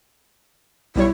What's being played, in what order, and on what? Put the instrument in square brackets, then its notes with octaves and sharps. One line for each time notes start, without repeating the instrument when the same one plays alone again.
[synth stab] B1 G3 C#5 [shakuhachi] E4